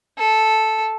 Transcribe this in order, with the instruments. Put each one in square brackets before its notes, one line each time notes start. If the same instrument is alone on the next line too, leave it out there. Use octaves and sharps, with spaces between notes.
[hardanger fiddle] A4